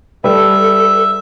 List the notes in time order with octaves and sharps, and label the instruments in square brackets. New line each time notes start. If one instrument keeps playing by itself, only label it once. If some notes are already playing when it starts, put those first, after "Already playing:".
[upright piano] G3 [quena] A4 [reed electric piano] B4 [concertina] E5